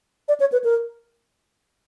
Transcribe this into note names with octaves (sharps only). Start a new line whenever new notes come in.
D5
C#5
B4
A#4